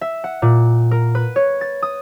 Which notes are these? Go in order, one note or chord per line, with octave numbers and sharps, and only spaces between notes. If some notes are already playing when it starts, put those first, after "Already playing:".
E5
F#5
A#2
A#4
B4
C#5
A6
D#6